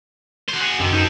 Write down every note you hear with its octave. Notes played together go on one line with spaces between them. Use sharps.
F#4 C5
F#4 G#4
F#2 D3 D#3
F#2 C4 D#4 A4